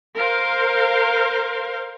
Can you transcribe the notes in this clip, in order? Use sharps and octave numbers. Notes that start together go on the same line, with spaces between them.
A#4 C5 F5